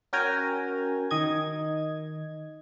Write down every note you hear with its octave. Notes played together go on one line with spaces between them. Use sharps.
C#4 F#4 A#4 G5 G#5 A#5
D#3 D#5 G#6